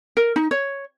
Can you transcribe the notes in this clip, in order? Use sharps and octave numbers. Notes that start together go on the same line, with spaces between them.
A#4
D#4
C#5